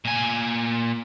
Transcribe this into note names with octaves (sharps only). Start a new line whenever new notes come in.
A#2 G#5